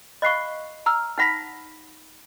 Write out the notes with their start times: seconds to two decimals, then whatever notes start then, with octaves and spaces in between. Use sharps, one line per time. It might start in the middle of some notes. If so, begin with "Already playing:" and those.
0.22 D#5 F5 B5 C#6 F#6 C7
0.86 A#5 E6 F6
1.18 D#4 F#5 B5 F6 A#6 B6